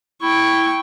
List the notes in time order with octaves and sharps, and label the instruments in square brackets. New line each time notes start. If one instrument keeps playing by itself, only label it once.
[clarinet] E4 [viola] G5 C#6